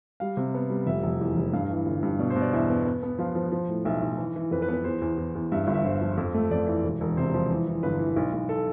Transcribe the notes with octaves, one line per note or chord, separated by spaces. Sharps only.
G3 F5
C3
B3
G3
F1 E5
F1
E2
F1
G2 F5
E3
G1
G2
B2 D5
C5
B2
D5
E2 E5
B3
B3
B3
F3 F5
F3
F3
A2
B1 E5
B1
E3
E3
F2 B4
B4
B3
B4
E2 C5
E2
E2
E2
G2 E5
E5
G1
E5
G1 C5
F3
F2
A3
F2 D5
E3
E1
E1
C3 C5
F3
E3
E3
G1 B4
E3
B1
B1
A4